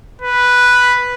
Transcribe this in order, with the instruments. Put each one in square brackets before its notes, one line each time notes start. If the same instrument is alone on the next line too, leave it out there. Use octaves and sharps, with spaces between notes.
[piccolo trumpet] B4